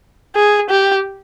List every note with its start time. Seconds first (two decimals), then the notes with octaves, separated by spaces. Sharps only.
0.35 G#4
0.70 G4